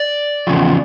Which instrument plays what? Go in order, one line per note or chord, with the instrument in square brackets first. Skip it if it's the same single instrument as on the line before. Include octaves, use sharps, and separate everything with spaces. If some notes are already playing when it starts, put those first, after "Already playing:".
Already playing: [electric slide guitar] D5
E2 C#3 F3